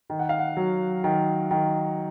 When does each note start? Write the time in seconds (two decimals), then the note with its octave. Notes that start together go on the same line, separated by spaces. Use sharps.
0.10 D#3
0.19 F#5
0.29 F5
0.39 F#5
0.57 F#3
1.04 D#3
1.51 D#3